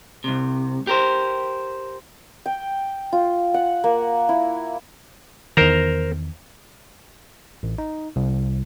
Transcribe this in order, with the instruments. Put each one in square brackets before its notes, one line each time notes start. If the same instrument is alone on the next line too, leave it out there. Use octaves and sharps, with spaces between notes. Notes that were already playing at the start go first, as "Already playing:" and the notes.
[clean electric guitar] C2 C3
G4 A#4 C5
[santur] G5
F4
F#5
A#3
E4
[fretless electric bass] E2 D#3 [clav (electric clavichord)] A#4 C5 A#5
[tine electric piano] A1
D#4
C2